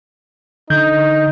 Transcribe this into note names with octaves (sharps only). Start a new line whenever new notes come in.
D3 D#4 G6